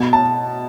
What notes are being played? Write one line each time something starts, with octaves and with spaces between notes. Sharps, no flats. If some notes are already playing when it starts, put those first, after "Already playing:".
Already playing: B2
A5